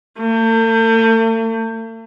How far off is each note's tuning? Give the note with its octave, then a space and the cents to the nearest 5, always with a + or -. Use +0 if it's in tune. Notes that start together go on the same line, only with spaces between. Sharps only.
A3 +45